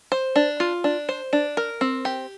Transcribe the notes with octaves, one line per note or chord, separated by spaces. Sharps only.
C5
D4
F4
D4
C5
D4
A#4
C4
G4